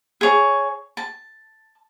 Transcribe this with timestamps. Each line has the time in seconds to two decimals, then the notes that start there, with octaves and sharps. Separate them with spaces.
0.21 G#4 C#5
0.97 A5